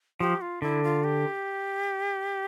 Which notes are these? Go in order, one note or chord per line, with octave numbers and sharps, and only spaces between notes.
F3 G4
F4
D3 E4
F4
G4